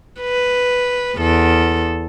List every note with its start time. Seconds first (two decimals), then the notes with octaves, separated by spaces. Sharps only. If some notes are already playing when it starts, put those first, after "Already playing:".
0.20 B4
1.17 E2 A4